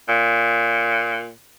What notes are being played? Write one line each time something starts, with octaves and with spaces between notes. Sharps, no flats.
A#2